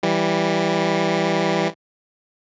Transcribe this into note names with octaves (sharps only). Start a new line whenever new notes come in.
E3 G3